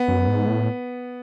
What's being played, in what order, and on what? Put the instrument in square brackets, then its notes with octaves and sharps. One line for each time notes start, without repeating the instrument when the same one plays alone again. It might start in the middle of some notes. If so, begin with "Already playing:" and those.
Already playing: [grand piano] B3
[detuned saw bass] F#2
G#2
A2